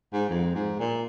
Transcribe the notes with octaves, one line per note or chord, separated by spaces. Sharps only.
G#2
F2
G#2
A#2